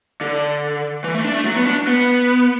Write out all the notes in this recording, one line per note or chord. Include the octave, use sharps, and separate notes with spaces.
D3
E3
A3
D4
A3
F#3
B3
D4
B3